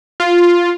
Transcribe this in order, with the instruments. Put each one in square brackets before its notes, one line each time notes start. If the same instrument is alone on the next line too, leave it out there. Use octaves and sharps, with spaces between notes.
[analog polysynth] F4